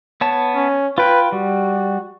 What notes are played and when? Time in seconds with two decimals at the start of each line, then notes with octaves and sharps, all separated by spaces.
0.21 B3 C#5 A5
0.55 C#4
0.98 F4 B4 G5
1.32 G3 F#4